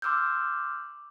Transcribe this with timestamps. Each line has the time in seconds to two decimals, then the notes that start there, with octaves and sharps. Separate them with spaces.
0.02 C6 D6 E6 F6 G6